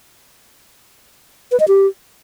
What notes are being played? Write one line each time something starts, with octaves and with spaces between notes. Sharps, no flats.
B4
D#5
G4